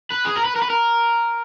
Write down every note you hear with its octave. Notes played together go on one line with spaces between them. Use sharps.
B4
G#4
A#4
B4
A#4
B4
A#4